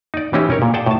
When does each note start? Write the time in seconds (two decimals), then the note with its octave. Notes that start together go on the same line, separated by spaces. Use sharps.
0.14 D#4 D5
0.33 E3 C4 C#4 D#4 E4 G4
0.50 C#4 A#4 C#5
0.62 A#2
0.74 G#4 D5 F#5 G5 A5
0.86 A2 A5